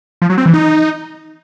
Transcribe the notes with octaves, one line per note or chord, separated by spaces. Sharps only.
F3
F#3
C4
E3
D#4